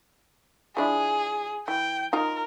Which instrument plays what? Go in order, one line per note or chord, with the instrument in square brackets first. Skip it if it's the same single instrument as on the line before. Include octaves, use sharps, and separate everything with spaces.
[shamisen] F3 D4 E4 [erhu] G#4
[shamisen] E3 [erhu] G5
[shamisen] D#4 F4 A#5 [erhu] A#4